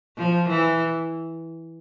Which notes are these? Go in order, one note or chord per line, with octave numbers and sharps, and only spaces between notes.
F3
E3